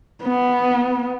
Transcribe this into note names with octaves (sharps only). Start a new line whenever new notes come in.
B3